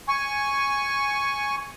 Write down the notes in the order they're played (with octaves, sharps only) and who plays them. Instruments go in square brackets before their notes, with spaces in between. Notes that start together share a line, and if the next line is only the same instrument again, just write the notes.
[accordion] G#5 C#6